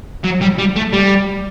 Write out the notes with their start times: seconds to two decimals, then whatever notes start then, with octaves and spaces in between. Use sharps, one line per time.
0.24 F#3
0.42 G3
0.59 G3
0.76 A3
0.93 G3